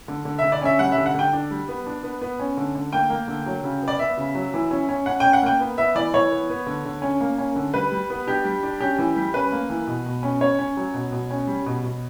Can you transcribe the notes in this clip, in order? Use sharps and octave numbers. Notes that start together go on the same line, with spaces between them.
D3
D3
E5
D3
D5
C#4 E5
G3 F#5
E5
D3
F#5
D3 G5
D4
G3
B3
D4
B3
B3
C#4
D3
D3
A#3 G5
A#3
D3
F#3
C#3
B3
D5
B3 E5
C#3
F#3
E3
C#4
C#4
C#4 F#5
C#4 G5
F#5
A#3 G5
B3
B3 E5
E3 D5
E3 C#5
B3
B3
D3
D3
C#4
A#3
C#4
D3
G3 B4
G3
B3
D4 G4
G3
D4
C#4 G4
E3
G3
C#4 B4
A#3
E3
B2
B2
C#4
C#4 C#5
C#4
F#3
B2
B2
C#4
G3
B2
B2